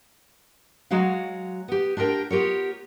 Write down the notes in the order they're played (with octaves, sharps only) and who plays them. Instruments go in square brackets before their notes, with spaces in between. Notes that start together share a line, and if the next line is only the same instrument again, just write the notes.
[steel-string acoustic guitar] F#3 G#3 F#4 C#5 F5
B3 G4
D4 F4 G4 A#4 G5
B3 F4 G4 A#4 C#5